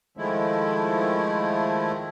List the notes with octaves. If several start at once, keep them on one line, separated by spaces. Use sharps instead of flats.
D#3 F3 G#3 A3 E4